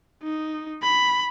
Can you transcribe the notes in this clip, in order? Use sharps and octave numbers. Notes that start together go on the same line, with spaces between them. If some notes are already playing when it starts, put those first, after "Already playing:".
D#4
B5